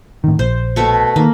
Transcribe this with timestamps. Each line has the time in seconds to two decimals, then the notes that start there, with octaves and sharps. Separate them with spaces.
0.24 A2 D#3
0.39 A#1 C5
0.76 B2 A3 C#6
1.16 D#3 A#3